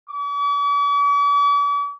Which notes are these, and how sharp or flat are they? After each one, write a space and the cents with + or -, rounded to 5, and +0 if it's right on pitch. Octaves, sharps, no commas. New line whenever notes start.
D6 -45